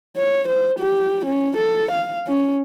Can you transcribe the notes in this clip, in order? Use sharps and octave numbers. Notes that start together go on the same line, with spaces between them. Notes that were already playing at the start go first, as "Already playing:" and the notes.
C#5
C5
G4
C#4
A4
F5
C#4